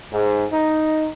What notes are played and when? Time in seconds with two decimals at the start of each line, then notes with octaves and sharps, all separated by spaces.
0.11 G#2
0.52 D#4